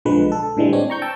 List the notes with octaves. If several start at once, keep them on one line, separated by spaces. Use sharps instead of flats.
B1 D3 F3 G#3 B4
A4
A2 D3 E3 G3 G#3
C4 D4 C#5
A#5 C#6 G6
G5 A5 E6